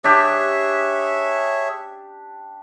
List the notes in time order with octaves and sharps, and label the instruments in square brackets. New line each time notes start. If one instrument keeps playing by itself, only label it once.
[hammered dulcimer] D4 G4 [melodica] G#4 C#5 E5